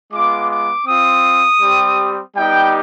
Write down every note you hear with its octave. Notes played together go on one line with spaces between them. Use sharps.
G#3 B3 F4 D6
D6
C4 F4 D#6
G3 C4 G4
G3 B3 D#4 G4 G5